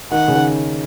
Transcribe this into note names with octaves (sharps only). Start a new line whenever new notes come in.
D#3 F#5
C#3
D#3